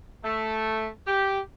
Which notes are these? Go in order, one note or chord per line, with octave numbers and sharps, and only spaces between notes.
A3
G4